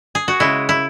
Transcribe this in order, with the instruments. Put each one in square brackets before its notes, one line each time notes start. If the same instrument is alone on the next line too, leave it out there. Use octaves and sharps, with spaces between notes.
[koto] G#4
F#4
C#3 G#3 E4
E4